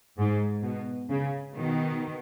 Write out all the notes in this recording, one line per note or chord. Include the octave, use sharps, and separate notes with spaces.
G#2
B2
C#3
B2 D#3